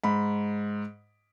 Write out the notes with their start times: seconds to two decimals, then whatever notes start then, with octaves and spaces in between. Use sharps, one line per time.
0.04 G#2 B5